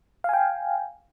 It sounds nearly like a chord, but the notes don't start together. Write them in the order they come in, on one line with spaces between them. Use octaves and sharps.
F5 G#5 G5